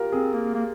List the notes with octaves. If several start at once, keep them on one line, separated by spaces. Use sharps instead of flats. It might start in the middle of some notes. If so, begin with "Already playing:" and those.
Already playing: F4 G4 A#4
C4 G#4
A#3
A#3